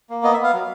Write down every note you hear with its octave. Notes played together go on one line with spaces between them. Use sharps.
A#3
B3 D#5
E5
B3
F5
F#3